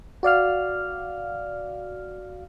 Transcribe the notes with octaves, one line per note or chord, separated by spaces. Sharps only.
F#4 D5 F5 F6